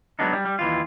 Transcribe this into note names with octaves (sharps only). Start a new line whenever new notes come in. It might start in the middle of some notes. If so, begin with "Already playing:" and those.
F#3 G#3 B3 D4 D#4
G3
G3
D#2 E3 F4